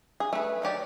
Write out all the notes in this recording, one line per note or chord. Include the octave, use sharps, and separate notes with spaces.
G#4
A3 B4
D#3 F#3 G4 D5